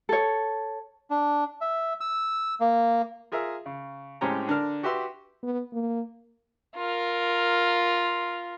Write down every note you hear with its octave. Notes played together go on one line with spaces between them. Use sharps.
A4 C#5
D4
E5
E6
A#3
F4 G#4 A#4 E5
C#3
A2 G#3 C4 C#4 G4 A#5
D3 D4 A#4 F6
F#4 G4 B4 E5 C6
B3
A#3
F4 A#4